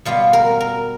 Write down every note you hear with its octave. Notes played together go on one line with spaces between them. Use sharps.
B2 G3 B3 F4
A#4
A#4